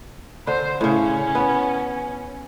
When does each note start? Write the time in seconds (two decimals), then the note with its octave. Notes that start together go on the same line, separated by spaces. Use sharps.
0.47 D3 C5
0.81 A2 C#3 C#4
1.35 B3